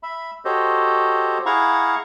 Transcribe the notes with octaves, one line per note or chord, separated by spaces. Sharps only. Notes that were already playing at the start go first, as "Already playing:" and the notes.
E5 B5
F#4 G4 A4 C5 C#5 D#5
E4 G#4 F5 F#5 A#5 C#6